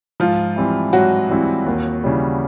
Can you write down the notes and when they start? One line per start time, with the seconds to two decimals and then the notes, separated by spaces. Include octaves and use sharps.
0.20 G#2 F3 F4
0.56 E3 G3 C4 E4
0.93 G#2 F#3 F#4
1.29 E3 G3 C4 E4
1.66 D#2
2.04 C#3 E3 G3